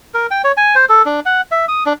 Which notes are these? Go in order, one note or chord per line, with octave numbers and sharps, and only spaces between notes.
A#4
G5
C#5
G#5
C5
A4
D4
F#5
E5
D#6
D4